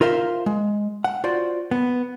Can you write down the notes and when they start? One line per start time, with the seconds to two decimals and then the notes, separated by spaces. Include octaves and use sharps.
0.01 F4 A#4 C5 E5 F5
0.46 G#3
1.04 F#5
1.24 F4 F#4 C5 D5
1.71 B3